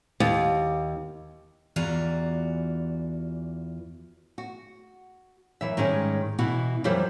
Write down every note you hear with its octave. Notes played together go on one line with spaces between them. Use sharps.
D#2
E2 E3 F4 F#4 D5 A#5
F#4
F#2 E3 E5
G#2 D#3 G3 G#3 C#4
B2 E3 E4 F#4
F#2 E3 F3 G3 C5 E5